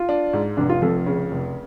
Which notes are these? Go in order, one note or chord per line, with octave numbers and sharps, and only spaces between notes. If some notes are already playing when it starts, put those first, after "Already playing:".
Already playing: F4
D4
G#2
F1 D4
F4
F2 A4
C#3
F1